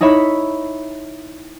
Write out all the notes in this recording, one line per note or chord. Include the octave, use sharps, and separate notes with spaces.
D#4 E4 C#5 E5 B5